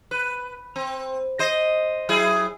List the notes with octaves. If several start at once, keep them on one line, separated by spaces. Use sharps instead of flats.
B4
C4
C5 D#5
F#3 E4 G#4